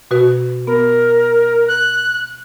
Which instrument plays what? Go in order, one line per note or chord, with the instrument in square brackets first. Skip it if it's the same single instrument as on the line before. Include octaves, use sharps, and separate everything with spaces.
[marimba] B2 F#4 B4
[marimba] B3 [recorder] A#4
[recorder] F#6